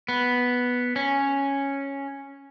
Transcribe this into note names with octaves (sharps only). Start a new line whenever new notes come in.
B3
C#4